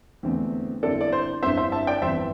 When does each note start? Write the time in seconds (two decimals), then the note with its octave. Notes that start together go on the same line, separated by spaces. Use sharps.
0.23 E2 D3 A3 C4
0.82 G1 G2 D3 C4 E4 A4 D5
1.01 D5
1.12 C5
1.42 G1 G2 D3 C4 E4 C5 E5
1.57 C5 E5
1.72 E5 A5
1.87 D5 G5
2.02 G1 G2 E3 C4 C5 E5